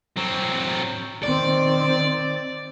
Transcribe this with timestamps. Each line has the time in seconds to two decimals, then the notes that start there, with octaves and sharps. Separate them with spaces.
0.16 F#3 C4
1.23 D#3 C4 D5